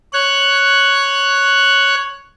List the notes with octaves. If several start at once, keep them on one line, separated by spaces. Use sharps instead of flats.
C#5 F#6